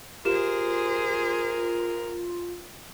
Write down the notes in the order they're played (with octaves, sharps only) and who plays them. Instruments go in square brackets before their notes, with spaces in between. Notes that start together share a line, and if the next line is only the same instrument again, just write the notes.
[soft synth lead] F4 [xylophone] G4 E7 [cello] G#4 C5 [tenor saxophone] A#4